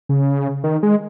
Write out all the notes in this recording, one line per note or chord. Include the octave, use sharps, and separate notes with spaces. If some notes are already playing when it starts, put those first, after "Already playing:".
C#3
D#3
G#3